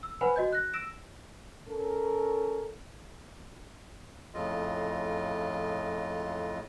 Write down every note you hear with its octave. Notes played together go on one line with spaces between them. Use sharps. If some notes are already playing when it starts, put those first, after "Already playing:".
E6
B4 C5 F#5 G#5 B5
F#4 D#5 G6
F#6 A#6
E6 A#6 D7 E7
C#4 A4 A#4
F2 A2 C#3 F4 D#5